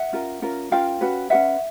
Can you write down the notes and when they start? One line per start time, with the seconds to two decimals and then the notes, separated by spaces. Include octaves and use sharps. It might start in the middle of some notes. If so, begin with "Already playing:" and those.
Already playing: E5 F#5
0.13 C#4 F4 A#4
0.42 C#4 F4 A#4
0.71 C#4 F4 A#4 F5 G5
1.01 C#4 F#4 B4
1.30 C#4 F#4 B4 E5 F#5